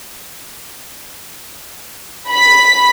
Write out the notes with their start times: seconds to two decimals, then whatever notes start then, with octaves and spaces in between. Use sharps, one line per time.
2.30 B5 B6